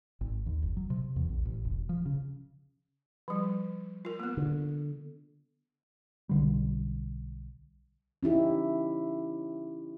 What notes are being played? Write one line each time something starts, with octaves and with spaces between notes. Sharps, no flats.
G#1
D#2
F#1
F#3
C3
E2
A#1
A1
E1
F3
C#3
F3 G3
F4 A#4
A#3 B3
D3
B1 D3 G3
C#4 D#4 E4 G4